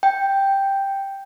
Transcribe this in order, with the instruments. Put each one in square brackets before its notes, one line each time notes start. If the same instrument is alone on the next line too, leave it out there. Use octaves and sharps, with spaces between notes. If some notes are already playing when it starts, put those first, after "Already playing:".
[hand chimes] G5